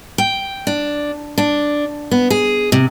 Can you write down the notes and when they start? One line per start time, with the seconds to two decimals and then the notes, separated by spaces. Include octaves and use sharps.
0.18 G5
0.67 D4
1.38 D4
2.11 B3
2.30 G#4
2.72 C3